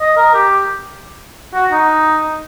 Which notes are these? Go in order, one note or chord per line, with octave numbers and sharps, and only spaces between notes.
D#5
A#4
G4
F#4
D#4